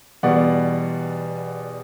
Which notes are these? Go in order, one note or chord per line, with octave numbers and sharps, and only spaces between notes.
E2 B2 G3 D5 F#5